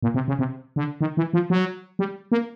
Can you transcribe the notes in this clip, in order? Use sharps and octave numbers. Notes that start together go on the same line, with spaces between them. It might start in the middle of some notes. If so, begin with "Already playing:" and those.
A#2
C3
C#3
C3
D3
D#3
E3
F3
F#3
G3
A#3